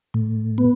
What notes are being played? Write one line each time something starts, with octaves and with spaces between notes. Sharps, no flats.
A2
B3